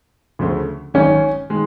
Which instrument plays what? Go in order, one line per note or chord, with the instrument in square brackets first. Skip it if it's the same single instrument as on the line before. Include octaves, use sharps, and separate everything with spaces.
[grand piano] D2 C#3 F3 A3
[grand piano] G#1 F#2 D#3 [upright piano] C#4
[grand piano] D#3 G#3